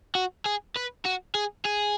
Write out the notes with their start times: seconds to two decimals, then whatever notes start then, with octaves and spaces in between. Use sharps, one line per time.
0.15 F#4
0.46 G#4
0.76 B4
1.05 F#4
1.35 G#4
1.65 G#4